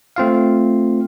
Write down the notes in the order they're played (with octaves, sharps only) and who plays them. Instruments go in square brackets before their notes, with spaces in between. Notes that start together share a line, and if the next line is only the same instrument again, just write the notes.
[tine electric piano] A3 C4 F4 F5